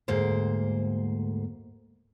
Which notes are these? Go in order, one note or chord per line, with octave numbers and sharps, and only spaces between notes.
D2 G#2 A#3 C5